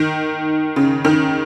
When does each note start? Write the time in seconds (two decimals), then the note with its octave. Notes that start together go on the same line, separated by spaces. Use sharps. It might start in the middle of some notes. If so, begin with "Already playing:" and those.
Already playing: D#3
0.76 C#3
1.05 D#3